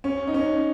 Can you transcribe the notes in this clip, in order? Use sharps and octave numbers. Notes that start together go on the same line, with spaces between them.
C#4
D#4
C#4